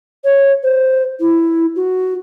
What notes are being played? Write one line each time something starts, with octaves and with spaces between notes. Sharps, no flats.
C#5
C5
E4
F#4